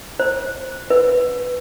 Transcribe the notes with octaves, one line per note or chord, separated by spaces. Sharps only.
C5
B4